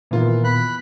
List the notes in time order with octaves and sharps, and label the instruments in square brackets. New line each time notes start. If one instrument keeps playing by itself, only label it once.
[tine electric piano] A#2 D#3 B3 [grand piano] E3 A#3 F4
[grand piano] E2 [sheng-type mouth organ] B5 F#6